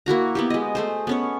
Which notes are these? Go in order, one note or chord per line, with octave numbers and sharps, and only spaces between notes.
A#3 E4 F#4 A#5
B3 E4 G4
G#3 D#5
A3 G#4 C5
B3 C#4 C#5